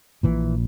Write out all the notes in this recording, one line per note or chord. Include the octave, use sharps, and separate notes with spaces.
A#1 A#2 E3